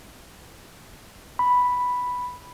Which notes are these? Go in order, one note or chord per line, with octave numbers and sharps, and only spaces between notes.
B5